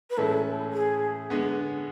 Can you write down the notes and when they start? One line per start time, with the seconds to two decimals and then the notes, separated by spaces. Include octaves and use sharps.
0.10 B4
0.17 A2 E3 G#3 C#4 E4 A4
0.73 G#4
1.30 D3 G#3 B3